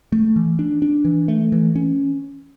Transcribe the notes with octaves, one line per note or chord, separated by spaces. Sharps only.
A3
E3
D4
D4
E3
A3
E3
C#4